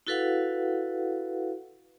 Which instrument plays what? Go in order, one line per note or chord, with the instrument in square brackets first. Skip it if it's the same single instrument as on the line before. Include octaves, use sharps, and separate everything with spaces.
[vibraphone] E4 F#4 A4 B4 F5 F#5